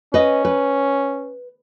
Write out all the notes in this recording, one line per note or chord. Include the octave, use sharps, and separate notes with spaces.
C#4 B4 D#5
B4